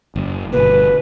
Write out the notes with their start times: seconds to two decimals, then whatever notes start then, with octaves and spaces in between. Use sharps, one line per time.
0.16 F#1
0.53 G1 B2 B4